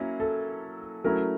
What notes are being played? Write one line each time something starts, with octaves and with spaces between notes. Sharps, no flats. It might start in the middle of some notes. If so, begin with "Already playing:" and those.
Already playing: F#3 A#3 C#4 E4
A4
F#3 A3 C#4 E4 A#4